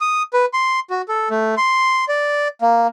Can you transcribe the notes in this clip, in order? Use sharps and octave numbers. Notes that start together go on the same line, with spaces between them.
D#6
B4
C6
F#4
A4
A3
C6
D5
A#3